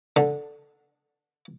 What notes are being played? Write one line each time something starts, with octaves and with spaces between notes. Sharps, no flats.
D3